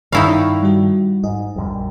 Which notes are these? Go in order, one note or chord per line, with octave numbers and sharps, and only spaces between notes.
G2 D#3 D#4 E4 C#5 F5 B5 C#6
G3 F#4
G#2 D#5
A#1 F#2 G3